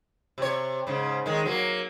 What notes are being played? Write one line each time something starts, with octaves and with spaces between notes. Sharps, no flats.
C3 C#5
G#2 C#3
D#3 G#3
F#3 A#3